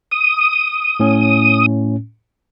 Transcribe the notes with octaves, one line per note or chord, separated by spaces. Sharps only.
D#6
A2 C#4